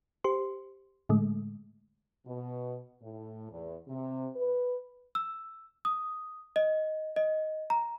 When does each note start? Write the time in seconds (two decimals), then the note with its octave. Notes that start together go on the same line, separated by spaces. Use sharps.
0.24 G4 C5 C6
1.09 A2 D3 G#3 A3
2.26 B2
3.02 A2
3.50 E2
3.88 C3
4.36 B4
5.15 E6
5.85 D#6
6.56 D#5
7.16 D#5
7.70 A#5